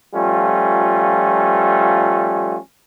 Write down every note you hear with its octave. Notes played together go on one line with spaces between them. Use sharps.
F3 G3 A3 C#4 F4